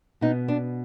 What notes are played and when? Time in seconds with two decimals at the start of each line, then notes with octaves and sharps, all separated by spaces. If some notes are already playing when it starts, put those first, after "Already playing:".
0.21 B2 B3 D#4
0.48 D4